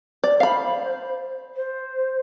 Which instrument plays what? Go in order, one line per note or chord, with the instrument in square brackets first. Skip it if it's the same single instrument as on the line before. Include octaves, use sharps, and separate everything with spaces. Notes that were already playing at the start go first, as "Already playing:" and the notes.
[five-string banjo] D5
[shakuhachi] C5 [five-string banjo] F5 B5
[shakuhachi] C5